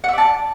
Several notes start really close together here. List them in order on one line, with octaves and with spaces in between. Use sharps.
F#5 E5 D5 A5